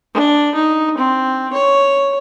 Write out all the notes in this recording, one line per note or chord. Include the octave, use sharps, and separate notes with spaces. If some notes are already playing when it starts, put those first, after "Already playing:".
D4
D#4
C4
C#5